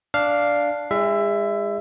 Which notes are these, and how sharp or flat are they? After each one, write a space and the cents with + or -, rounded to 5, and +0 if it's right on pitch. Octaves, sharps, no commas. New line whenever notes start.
D4 -5 F5 +0
G#3 -35 E4 +20 E5 +15